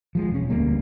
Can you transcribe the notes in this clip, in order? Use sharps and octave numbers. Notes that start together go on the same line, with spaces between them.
F3 G3 G#3
E1 C#4
D2 G3 A#3 B3